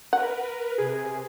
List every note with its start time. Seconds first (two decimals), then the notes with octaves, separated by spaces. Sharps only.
0.13 A#4 B4 F#5
0.78 C3 G#4